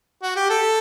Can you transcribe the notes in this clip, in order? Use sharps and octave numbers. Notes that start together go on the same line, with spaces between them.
F#4
G4
A4